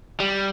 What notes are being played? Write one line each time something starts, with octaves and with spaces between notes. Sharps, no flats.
G3